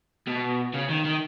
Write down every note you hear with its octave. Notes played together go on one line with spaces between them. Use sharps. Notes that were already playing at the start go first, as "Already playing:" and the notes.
B2
C#3
D#3
D#3